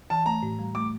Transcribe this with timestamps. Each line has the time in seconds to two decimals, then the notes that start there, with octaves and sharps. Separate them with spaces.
0.10 E3 A5
0.26 A3 A#5
0.43 A2
0.59 G3
0.75 A3 D6